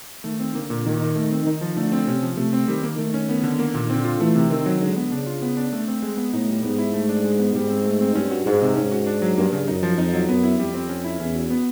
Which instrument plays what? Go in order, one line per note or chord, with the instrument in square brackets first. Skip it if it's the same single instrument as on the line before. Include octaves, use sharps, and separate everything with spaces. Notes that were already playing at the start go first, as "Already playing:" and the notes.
[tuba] D#3 [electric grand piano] A3
[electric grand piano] C4
[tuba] D3 [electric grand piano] A#3
[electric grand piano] A#2
[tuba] D#3 [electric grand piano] A#3
[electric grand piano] D#4
A3
C4
[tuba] D#3 [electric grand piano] D#4
[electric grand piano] F3
[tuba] D3 [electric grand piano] A3
[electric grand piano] C4
[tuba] C3 [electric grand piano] C#4
[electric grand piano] F3
[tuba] C3 [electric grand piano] A3
[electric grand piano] C4
[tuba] D#3 [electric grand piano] G3
[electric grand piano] A#3
[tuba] D#3 [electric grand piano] A3
[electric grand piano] C#4
[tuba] D#3 [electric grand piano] B3
[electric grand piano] D3
A#3
A#2
[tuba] D3 [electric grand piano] C4
[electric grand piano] F4
[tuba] E3 [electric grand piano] A3
[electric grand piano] C3
[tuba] D#3 [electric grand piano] C4
[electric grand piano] F#3
[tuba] D3 [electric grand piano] G#3
[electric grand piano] B3
[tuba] C#3 [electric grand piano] D4
[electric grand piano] F4
B3
D4
A3
C4
G#3
B3
[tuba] A2 [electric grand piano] D#4
[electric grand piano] G3
[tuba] G#2 [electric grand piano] B3
[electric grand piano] E4
A3
D4
G#3
B3
[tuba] G#2 [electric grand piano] G3
[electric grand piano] C4
A3
C4
[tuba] G2 [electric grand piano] C#4
[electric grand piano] F#4
[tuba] G#2 [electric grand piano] G#3
[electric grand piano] C3
[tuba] G#2 [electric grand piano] C#4
[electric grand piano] F#4
D4
F#3
[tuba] G2 [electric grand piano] A#3
[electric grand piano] C#3
[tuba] F#2 [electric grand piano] D#4
[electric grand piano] F3
[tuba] F2 [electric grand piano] D#4
[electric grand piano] F#3
[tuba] F#2 [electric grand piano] B3
[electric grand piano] E4
[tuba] F2 [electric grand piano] G3
[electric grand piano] C4
C#4
E4
[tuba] E2 [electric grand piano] C#4
[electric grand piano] F#4
B3